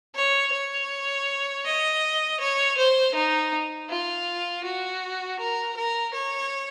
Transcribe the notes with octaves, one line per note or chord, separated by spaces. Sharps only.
C#5
C#5
D#5
C#5
C5
D#4
F4
F#4
A#4
A#4
C#5